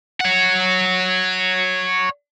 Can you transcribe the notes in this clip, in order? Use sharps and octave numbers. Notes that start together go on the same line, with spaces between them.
C#5 F#5